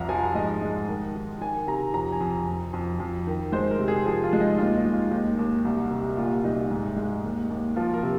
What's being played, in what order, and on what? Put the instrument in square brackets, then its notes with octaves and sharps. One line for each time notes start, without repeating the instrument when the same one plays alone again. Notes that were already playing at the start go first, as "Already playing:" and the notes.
Already playing: [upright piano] C2 F2 A#5
F3 G#5
G#2 D#5
G#3
D#3
D#3
D#3 G#5
C3 A#5
F2 A#5
G#5
F2
F2
F2
F2
D#3
G#3 C5
A#4
C3
G#4
F3 G#4
F4
G#3
D#4
D#2 F4
D#4
G#3
F4
D#2 D#4
D#2
C2
C3
A#2 F4
C2 D#4
G#2
G#3
D#2
D#2
F3 F4
A#4
C3